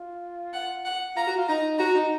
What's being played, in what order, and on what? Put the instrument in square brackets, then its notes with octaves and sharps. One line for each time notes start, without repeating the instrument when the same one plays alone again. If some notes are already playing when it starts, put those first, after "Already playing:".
Already playing: [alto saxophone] F4
[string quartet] F#5
F#5
[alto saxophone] F4 [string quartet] A#5
[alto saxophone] F#4
F4
[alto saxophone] D#4 [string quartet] A#5
[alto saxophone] F#4 [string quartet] A#5
[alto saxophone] D#4